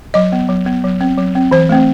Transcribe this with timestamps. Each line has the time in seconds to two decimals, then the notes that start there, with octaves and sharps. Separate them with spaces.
0.14 F#3 D#5
0.32 B3
0.49 F#3
0.66 B3
0.84 F#3
1.01 C4
1.18 F#3
1.35 C4
1.51 E3 C5
1.69 A3 C4